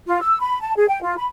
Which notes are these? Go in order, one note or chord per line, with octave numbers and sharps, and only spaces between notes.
F4
E6
B5
A5
G#4
G5
F4
B5